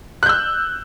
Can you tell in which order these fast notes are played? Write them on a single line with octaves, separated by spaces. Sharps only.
F#6 G6 E6